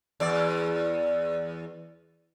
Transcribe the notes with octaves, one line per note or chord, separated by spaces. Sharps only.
E2 D5